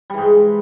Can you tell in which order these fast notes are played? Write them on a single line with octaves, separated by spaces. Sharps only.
G3 E3 G#2 G#3